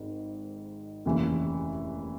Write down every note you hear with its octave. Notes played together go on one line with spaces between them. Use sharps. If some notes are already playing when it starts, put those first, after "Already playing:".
Already playing: G#1 G#2 D#3
F1 D#2 C#3 E3